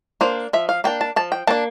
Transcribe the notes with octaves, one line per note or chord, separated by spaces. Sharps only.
A#3 D4 C5
F3 E5
F5
A#3 D4 G5
A5
F3 A5
G5
A#3 D4 A5